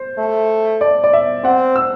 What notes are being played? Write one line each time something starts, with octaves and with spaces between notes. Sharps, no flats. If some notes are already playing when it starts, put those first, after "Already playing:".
Already playing: C5
A3
D5
D5
E5
C4 F#5
E6